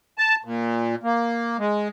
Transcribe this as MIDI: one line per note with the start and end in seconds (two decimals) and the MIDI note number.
0.18 0.35 81
0.44 0.95 46
1.03 1.57 58
1.59 1.88 56